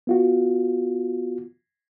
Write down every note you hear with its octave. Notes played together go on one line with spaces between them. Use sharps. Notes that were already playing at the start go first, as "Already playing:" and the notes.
B3 F4 F#4